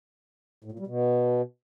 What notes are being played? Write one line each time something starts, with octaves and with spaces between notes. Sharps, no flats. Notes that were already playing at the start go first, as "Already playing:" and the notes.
A2
A#2
G3
B2